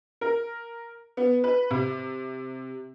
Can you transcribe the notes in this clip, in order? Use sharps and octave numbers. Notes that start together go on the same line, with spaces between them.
A#4
B3
B4
C3